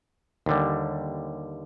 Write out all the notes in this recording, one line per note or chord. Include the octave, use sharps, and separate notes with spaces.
D#2 D3 G3